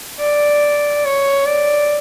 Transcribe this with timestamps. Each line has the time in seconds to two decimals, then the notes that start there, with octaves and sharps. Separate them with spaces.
0.20 D5
1.05 C#5
1.46 D5